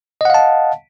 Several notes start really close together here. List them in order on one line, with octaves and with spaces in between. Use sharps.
D#5 F#5 F5 A5